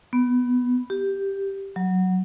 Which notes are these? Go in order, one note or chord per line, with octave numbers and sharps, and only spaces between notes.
B3
G4
F#3